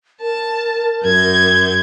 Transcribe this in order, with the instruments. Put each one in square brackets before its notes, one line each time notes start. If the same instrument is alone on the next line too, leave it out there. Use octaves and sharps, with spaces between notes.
[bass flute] A#4 [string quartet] A5
[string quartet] F#2 G6 G#6